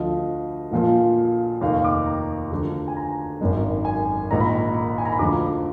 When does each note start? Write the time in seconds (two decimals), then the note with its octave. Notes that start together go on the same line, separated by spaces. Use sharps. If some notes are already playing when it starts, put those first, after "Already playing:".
Already playing: D2 D3 F3 D#5
0.72 A#1 A#2 F3
1.61 F1 D#2 D#3 F5
1.84 D6
2.06 A#5
2.51 D2 D3 F3
2.88 G#5
2.96 A#5
3.40 G#1 F#2 D#3
3.85 G#5
4.30 A#1 G#2 D#3 A#5
4.40 B5
4.50 A#5
4.74 B5
4.98 G#5
5.05 A#5
5.12 B5
5.19 D2 D3 F3 D6